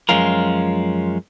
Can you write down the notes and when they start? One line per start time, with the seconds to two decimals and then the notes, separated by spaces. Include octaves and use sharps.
0.09 F#2 F3 G#3 C#4 F4 A#4